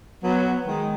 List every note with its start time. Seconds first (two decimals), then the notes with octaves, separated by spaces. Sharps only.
0.22 F#3 B3
0.67 D#3 G#3